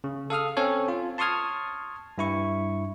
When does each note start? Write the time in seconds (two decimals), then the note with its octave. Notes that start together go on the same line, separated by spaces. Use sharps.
0.04 C#3
0.30 A4 F5 D#6 F6
0.57 C4 C#4 A4 C#5
0.88 F4
1.18 A5 C6 C#6 D#6 F6 G#6
2.18 G2 E4 C#6